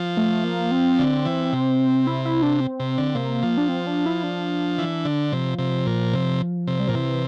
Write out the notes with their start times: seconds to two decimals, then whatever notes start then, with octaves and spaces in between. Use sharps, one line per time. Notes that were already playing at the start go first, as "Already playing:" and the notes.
Already playing: F3
0.17 A3
0.45 A#3
0.71 C4
0.99 D3
1.25 E3
1.53 C3
2.07 E4
2.25 E4
2.42 D4
2.61 C4
2.80 C3
2.98 D3
3.15 C3 A#3
3.43 F3
3.58 D4
3.69 C4
3.87 D4
4.06 E4
4.23 D4
4.78 E3
5.05 D3
5.32 C3 F3
5.58 C3
5.87 A#2
6.13 C3
6.67 C3
6.80 G3
6.87 A#2 F3
6.94 C3 E3